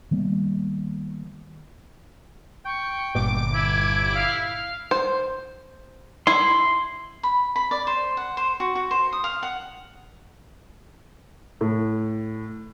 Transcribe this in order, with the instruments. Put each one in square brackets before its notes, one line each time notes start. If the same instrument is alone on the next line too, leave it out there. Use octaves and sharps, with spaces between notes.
[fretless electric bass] D#3 G3 A#3 B3
[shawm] G5 [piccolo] C#6
[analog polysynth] G1 D6 D7 [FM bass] A#2
[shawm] E4 [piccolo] G#6
[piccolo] F5
[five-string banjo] C5
[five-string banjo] E4 [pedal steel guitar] C6
[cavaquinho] B5
B5
D5
C5
F#5
C5
F#4
F#4
C5
D#6
F5
F#5
[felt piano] A2